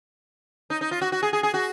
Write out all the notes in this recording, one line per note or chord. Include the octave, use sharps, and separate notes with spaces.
D#4
D#4
F4
F#4
F#4
G#4
G#4
G#4
F#4